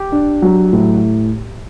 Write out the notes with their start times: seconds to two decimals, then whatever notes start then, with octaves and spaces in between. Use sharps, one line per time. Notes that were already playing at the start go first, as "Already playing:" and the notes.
Already playing: G4
0.12 D4
0.42 F#3
0.73 A2